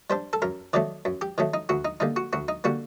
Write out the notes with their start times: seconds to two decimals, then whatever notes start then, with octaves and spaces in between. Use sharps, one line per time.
0.10 G3 D4 C5
0.33 A4
0.42 F#2 A#4
0.73 D#3 F#3 A3 D5
1.05 F#2
1.21 G4
1.38 D#3 F#3 A3
1.54 D#4
1.69 D2 F#4
1.85 D#4
2.00 D3 G3 A#3 D#4
2.16 F#4
2.33 D2 F#4
2.48 D#4
2.64 D3 G3 A#3 F#4